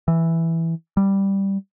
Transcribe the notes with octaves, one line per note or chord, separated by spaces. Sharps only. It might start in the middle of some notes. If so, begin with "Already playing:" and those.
E3
G3